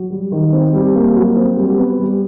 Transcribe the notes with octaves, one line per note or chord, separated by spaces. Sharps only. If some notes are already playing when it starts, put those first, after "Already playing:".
Already playing: F#3
G3
D#3
C4
G3
A#3
F#3
C4
G3
B3
G3